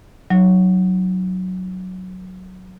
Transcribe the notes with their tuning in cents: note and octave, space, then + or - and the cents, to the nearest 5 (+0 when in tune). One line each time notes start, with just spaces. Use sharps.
F#3 +0 D#4 +0